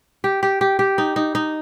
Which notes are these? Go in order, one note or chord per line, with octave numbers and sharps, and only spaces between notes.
G4
G4
G4
G4
D#4
D#4
D#4